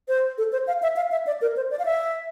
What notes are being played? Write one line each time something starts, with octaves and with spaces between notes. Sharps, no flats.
C5
A4
C5
F5
E5
F5
E5
D5
A#4
C5
D5
F5
E5